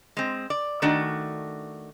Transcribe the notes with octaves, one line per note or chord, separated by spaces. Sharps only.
G#3 C4
D5
D#3 A3 D4 F#4